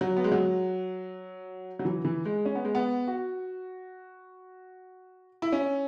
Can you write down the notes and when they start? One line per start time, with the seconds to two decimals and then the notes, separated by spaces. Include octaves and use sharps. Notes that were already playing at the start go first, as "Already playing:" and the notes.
0.01 F#3
0.16 B3
0.24 G#3
0.32 F#3
1.79 F#3
1.85 E3
2.05 E3
2.25 G#3
2.45 C#4
2.55 B3
2.65 G#3
2.75 B3
3.07 F#4
5.42 E4
5.52 C#4